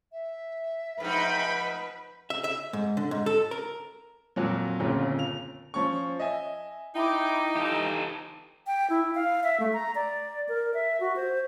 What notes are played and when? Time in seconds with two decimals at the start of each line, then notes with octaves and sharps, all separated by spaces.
0.12 E5
1.00 G#2 F3 D#4 B4 G5 B5
2.30 E5
2.44 E5
2.73 G#2
2.97 D3
3.11 G#2
3.26 A4
3.51 A#4
4.36 F2 A#2 F#3
4.80 G1 F2 A#2 C#3
5.19 F7
5.74 F3 C#4 C#6
6.19 D#5 E5 G#5
6.95 D#4 E4 G5 D6
7.56 E3 F4 G4 A4
8.67 G5
8.90 E4
9.15 F5
9.43 E5
9.60 A3
9.73 A#5
9.95 D5
10.49 A#4
10.74 E5
11.00 F#4
11.16 C5